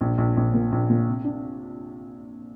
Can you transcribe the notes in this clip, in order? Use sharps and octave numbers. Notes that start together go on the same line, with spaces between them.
A#1
A#1
A#1
A#2
A#1
A#2
C3
D4